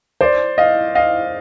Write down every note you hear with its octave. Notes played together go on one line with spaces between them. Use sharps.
C5 D5
D#5 F5
D#5 F5